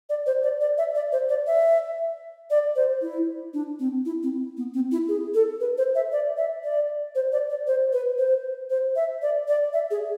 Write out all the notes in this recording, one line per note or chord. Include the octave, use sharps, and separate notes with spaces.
D5
C5
D5
D5
E5
D5
C5
D5
E5
D5
C5
E4
D4
C4
E4
C4
B3
C4
E4
G#4
A4
B4
C5
E5
D5
E5
D5
C5
D5
D5
C5
B4
C5
C5
E5
D5
D5
E5
G#4